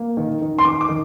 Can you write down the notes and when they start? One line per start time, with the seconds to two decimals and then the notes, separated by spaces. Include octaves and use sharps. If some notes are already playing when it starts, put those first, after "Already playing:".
Already playing: A#3
0.17 D#3
0.41 D#3
0.59 C6
0.65 D#3 D6
0.81 D6
0.89 D#3